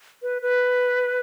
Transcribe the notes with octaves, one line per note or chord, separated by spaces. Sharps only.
B4
B4